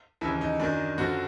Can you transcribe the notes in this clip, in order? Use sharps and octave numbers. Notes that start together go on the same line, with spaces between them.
D#2 C#3 E3 E4
D#4
F#2 D#3 D4
F#2 D3 F3 F#4